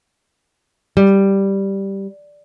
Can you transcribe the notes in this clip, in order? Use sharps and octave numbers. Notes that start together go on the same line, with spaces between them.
G3